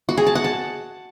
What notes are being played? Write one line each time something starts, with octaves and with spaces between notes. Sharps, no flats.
F#4
G#4
A5
F#5
A5